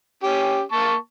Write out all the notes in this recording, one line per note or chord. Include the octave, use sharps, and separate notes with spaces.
C#4 G4
A#3 A5 C#6